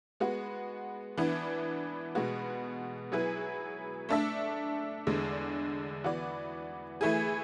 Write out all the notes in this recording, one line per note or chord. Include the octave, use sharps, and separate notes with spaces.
G#3 B3 F#4
E3 B3 D4
B2 G#3 B3 F#4
F#3 B3 E4 G#4 B4
A3 D4 A4 E5
E2 D3 G#3 D4
E3 B3 F#4 B4 D5
E3 A3 E4 G#4